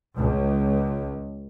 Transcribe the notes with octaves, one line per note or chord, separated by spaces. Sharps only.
C#2